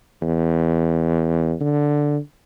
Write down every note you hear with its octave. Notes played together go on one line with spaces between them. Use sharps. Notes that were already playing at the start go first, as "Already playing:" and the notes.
E2
D3